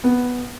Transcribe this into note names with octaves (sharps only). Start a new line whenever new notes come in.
B3